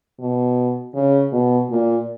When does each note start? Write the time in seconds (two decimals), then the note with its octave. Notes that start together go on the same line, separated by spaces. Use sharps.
0.20 B2
0.94 C#3
1.32 B2
1.70 A#2